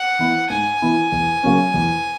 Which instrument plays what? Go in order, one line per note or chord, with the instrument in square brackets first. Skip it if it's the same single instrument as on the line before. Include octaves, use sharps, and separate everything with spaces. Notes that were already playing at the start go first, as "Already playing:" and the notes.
Already playing: [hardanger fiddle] F#5
[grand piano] E3 B3 E4
[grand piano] G#2 [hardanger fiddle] G#5
[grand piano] E3 B3 E4
E2
C#3 F#3 A#3 C#4
E2